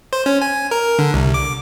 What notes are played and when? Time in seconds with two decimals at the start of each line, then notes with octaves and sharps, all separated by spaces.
0.13 C5
0.26 C#4
0.42 G#5
0.71 A#4
0.99 D3
1.14 C2
1.34 D6